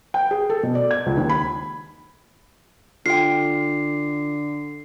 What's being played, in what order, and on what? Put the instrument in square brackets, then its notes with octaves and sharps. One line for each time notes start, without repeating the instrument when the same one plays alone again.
[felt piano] G5
G#4
A4
B2
D5
G#6
C#2
D#2
B5
[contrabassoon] D3 [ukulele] F4 G5 [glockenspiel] C7